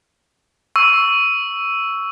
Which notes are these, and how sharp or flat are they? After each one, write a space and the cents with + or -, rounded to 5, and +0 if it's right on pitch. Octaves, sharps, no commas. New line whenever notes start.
C#6 +15 E6 +0